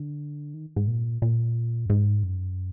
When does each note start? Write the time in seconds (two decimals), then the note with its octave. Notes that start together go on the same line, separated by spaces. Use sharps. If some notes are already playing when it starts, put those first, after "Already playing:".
Already playing: D3
0.54 D#3
0.76 G#2
0.88 A#2
1.22 A#2
1.86 F#2
1.90 G#2
2.23 F#2